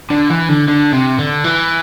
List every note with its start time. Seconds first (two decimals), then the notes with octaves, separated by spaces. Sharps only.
0.10 D3
0.29 E3
0.49 D3
0.68 D3
0.93 C3
1.19 D3
1.44 E3